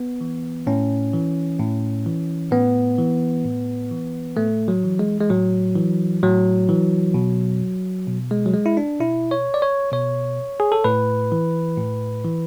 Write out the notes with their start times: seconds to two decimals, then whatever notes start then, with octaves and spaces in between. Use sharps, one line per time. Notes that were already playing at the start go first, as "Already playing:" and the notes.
Already playing: B3
0.21 E3
0.67 A2 C#4
1.13 E3
1.59 A2
2.06 E3
2.51 A2 B3
2.98 E3
3.45 A2
3.91 E3
4.37 A2 A3
4.68 F#3
4.84 E3
4.99 G#3
5.21 G#3
5.30 A2 F#3
5.75 E3
6.23 A2 F#3
6.69 E3
7.14 B2
8.07 B2
8.31 G#3
8.46 F#3
8.54 G#3
8.66 E4
8.77 D4
9.00 B2 E4
9.31 C#5
9.54 D5
9.62 C#5
9.92 B2 C#5
10.60 G#4
10.72 A4
10.84 A2 B4
11.32 E3
11.77 A2
12.24 E3